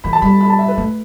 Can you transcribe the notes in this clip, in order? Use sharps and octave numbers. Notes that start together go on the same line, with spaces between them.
E3 B5
A5
G3 B5
B5
A5
E5
B4
A3